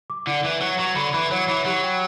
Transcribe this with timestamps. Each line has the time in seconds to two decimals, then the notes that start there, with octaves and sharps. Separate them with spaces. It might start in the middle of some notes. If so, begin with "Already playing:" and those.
0.10 D6
0.27 D3 E4
0.43 E3 E4
0.61 F#3 B4
0.79 F#3 C#6
0.96 D3 B5
1.14 E3 B5
1.31 F#3 C#5
1.48 E3 B5
1.65 F#3 G4
1.83 G5